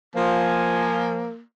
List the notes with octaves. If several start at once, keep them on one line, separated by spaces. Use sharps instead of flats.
F3 A#3 G#5